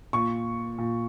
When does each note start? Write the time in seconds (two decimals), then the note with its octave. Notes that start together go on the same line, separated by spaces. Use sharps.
0.13 A#2 C#6
0.78 A#2